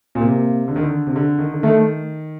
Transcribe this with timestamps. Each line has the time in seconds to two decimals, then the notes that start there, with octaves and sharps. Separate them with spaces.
0.15 A#2
0.20 C3 A#3
0.68 D3
0.76 D#3
0.83 D3
1.07 C3
1.16 D3
1.39 D#3
1.53 D3
1.63 D#3 A3